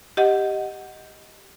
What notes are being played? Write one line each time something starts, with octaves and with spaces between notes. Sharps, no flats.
G4 D#5 F#5